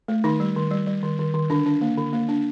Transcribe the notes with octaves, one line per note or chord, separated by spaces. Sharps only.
A3
D#3 D#4
G3
D#3
G3
G3
D#3
D#3
D#3
D3 D4
D4
A#3
D3
A#3
D4